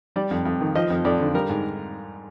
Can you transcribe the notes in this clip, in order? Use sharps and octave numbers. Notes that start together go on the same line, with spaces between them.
G3 D5
F2
F2
D#3
F3 D#5
F2
F2 D5
D3
G3 A#4
G#2